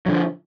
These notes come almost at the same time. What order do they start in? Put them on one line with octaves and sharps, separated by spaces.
F#3 D3 F3